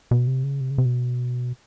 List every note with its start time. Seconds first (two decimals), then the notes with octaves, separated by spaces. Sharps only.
0.11 B2
0.27 C3
0.44 C#3
0.61 C3
0.71 C#3
0.78 C3
0.85 B2